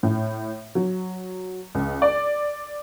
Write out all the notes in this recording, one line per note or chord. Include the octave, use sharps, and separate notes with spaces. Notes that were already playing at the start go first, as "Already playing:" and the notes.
A2
F#3
C#2
D5